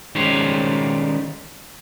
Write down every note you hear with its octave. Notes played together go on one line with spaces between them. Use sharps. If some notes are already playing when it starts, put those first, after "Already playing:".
D#3 G3 G#3 C#4 C5 C#5